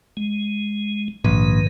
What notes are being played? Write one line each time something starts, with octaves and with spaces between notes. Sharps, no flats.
G#3
A#1 G#2 D#3 B4